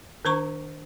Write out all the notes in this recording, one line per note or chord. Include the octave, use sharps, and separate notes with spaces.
D#3 D4 C5 A#5 C#6